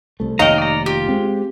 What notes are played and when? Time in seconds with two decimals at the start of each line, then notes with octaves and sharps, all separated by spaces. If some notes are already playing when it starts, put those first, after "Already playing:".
0.20 C2 A3
0.39 F1 D#2 D#4 C#5 F5 G5 A#5
0.58 D5 A#5
0.86 F4 G4
1.08 G#3 C4